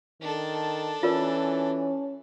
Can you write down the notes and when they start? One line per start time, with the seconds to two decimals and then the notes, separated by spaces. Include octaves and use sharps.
0.21 D#3 D4 A4
1.03 E3 C#4 F4 A#4 D5